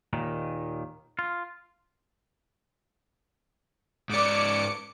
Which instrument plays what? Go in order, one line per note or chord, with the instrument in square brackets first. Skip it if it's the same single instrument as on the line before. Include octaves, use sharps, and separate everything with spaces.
[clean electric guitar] D#2 A#2 D#3
F4
[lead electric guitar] G#2 D5 [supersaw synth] D6 C#7